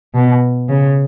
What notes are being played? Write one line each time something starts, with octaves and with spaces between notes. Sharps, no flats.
B2
C#3